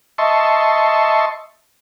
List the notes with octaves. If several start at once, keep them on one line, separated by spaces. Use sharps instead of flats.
D#5 E5 A5 C6 C#6